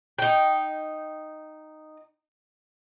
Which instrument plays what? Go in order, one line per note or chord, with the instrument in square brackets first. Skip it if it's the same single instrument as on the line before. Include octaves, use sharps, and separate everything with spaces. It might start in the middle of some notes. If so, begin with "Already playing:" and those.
[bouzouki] D#4 G5